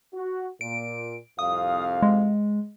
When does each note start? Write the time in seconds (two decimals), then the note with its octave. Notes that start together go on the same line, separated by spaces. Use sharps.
0.14 F#4
0.61 A#2 D7
1.39 C2 F2 F5 D#6
2.02 G#3